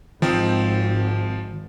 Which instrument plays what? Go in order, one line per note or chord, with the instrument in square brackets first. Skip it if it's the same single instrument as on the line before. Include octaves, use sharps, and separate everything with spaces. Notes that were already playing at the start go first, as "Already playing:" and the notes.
[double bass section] G#1 [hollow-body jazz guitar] D#3 D#5 [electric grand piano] F3 C4